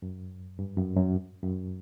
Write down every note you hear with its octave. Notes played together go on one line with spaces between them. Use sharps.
F#2
G2
F#2
F#2
F#2